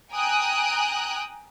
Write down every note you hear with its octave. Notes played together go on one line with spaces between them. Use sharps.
G5 G#5 A#5 D#6 F#6